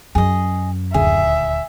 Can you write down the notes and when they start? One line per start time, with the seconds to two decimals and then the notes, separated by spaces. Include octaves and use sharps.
0.15 F#2 G#4 D#5
0.94 D#1 D2 G#4 E5